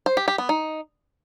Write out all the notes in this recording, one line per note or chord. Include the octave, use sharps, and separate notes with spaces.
C5
G4
G4
B3
D#4